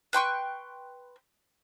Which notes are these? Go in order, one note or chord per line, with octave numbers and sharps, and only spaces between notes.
B4 G5 C6 C#6